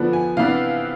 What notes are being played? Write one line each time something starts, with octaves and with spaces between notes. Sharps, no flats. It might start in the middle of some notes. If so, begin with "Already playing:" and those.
Already playing: D3 F3 B3 D4
G#5
C3 E3 B3 D4 F5